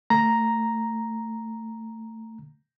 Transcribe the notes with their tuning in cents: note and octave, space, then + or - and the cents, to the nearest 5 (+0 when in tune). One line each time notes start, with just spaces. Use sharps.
A3 +20 A#5 +0